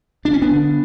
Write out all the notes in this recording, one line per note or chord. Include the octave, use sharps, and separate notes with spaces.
D2 D4
C#4
B3 D4
D3